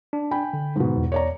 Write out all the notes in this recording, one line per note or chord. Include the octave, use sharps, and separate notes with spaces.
D4
G5 G#5 B5
D3
G#2 B2
E2
C#5 D5 A#5